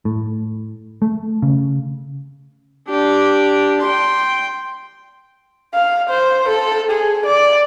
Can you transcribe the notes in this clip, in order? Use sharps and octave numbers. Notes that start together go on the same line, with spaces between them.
A2
A3
C#3
D4 G4
G5 C6
F5
C5
A4
G#4
D5